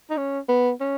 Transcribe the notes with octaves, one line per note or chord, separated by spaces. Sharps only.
D#4
C#4
B3
C#4